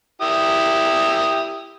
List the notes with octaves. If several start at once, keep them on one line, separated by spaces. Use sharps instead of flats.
E4 G4 D#6